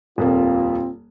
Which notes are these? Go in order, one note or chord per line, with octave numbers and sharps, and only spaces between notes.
D#1 F2 A#3 C4 F4